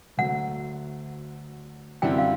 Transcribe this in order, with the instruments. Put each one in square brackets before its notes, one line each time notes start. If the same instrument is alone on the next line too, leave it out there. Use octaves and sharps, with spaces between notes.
[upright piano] D2 D3 F#3 A3 [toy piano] F#5
[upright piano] F#2 D3 G3 C4 E4 [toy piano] G5
[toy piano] F5